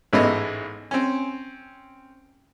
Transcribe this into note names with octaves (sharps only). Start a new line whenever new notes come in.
A1 G#2 A3 B3 E4 D#5
C4 C#4